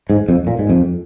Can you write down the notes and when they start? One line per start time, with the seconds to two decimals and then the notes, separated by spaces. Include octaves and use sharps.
0.10 G#2
0.29 F2
0.47 A#2
0.59 G#2
0.70 F2